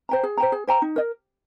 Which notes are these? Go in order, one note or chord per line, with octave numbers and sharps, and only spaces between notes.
C5 G5 A#5
G#4
C5 G5 A#5
G#4
C5 G5 A#5
D#4
A#4 D#5